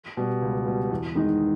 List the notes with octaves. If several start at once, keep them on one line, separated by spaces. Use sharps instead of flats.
B2 G3
C#2
B2 G3
E2
D#3 G#3 D#4 G#4